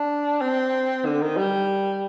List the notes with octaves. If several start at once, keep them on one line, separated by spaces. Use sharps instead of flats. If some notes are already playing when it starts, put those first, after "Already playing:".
Already playing: D4
C4
D3
D#3
G3